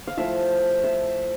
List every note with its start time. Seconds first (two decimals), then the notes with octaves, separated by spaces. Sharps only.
0.07 F5
0.17 F3 A3 E4 E5
0.84 E5